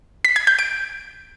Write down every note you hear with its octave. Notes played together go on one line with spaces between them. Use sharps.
B6
G#6
G6
D7